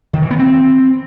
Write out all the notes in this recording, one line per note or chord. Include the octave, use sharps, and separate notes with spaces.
D#3
E3
B3
C4